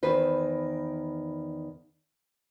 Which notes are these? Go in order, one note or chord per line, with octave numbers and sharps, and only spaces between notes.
E2 D#3 B4 C5